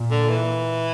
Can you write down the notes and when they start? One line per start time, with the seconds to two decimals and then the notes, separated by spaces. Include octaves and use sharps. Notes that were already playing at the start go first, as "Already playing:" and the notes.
Already playing: A#2
0.11 D3
0.29 E3